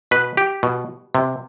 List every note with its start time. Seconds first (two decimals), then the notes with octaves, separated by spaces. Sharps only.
0.11 B2 B4
0.37 G4
0.63 B2
1.15 C3